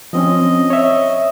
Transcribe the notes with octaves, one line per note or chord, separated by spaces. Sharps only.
F3 C4 C#4 D#5
C#5 E5